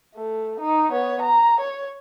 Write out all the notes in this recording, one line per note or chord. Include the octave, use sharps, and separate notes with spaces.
A3
D#4
B3 C#5
A#5
C#5